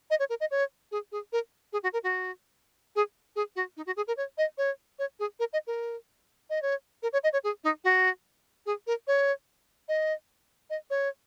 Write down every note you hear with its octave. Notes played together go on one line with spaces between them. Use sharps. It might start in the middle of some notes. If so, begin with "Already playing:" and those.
D#5
C#5
A#4
D#5
C#5
G#4
G#4
A#4
G#4
F#4
A#4
F#4
G#4
G#4
F#4
D#4
F#4
G#4
A#4
C#5
D#5
C#5
C#5
G#4
A#4
D#5
A#4
D#5
C#5
A#4
C#5
D#5
C#5
G#4
D#4
F#4
G#4
A#4
C#5
D#5
D#5
C#5